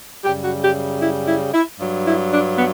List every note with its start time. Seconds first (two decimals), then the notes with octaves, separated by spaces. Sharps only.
0.25 F#2 C#3 G3 G4
0.44 F#4
0.64 G4
1.02 E4
1.28 E4
1.54 E4
1.80 G2 F#3
2.06 E4
2.31 D4
2.57 B3